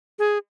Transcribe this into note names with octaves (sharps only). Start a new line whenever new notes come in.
G#4